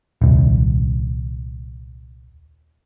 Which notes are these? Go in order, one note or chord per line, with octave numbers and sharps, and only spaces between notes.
D#1 C2